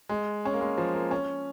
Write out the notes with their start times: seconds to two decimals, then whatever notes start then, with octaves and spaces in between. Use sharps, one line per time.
0.09 G#3
0.45 C#4
0.53 A#3
0.61 G#3
0.78 F3
0.94 A#3
1.11 C#4